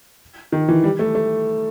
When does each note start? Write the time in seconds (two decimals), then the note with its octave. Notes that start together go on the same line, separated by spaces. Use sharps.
0.52 D#3
0.68 E3
0.84 G3
0.99 A3
1.15 A3